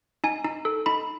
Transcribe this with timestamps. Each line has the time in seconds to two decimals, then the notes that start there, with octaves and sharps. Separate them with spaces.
0.24 D#4 G#5
0.45 D#4
0.65 A4
0.86 D#4 B5